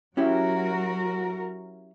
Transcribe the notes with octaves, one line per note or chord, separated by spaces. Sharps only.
F#3 C#4 E4 F#4 G4 A#4